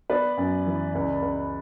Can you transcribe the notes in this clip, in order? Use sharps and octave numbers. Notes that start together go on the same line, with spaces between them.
B3 B4 D5
F#2
E3
C#2
C#2